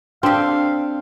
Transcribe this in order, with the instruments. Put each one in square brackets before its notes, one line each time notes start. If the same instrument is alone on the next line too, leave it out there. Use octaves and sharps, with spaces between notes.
[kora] C4 A4 [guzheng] D4 G4 [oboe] F5